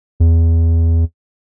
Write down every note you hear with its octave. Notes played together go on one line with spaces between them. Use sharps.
E2